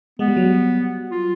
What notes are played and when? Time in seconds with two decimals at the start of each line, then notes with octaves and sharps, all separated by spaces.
0.19 G#3 B3
0.28 G3
0.37 F#3
0.44 G3
1.11 F4